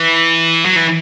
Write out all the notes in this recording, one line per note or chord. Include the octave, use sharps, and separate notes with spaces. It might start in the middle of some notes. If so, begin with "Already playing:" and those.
Already playing: E3
F#3
E3